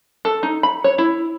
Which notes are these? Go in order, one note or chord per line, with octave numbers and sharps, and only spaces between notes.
A4
D#4
B5
C#5
E4